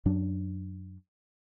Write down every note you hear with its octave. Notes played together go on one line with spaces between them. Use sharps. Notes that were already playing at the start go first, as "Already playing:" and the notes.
F#2 F#3 D4